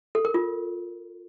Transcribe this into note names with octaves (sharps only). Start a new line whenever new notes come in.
A4
A#4
F4